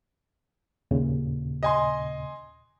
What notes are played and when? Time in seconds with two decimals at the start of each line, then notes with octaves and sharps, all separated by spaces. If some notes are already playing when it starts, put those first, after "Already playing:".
0.91 D#2 A#2 C#3
1.63 D#5 G#5 C6